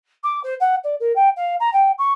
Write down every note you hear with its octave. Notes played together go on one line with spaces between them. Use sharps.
D6
C5
F#5
D5
A#4
G5
F5
A#5
G5
C#6